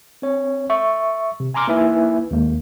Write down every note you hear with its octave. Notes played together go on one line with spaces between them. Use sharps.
C4 C#5
E5 C#6
C3
G#5 A#5 C6 D6 F6
A#3 D#4 E4 B4 E5 G#5
D#2 G#3 A#3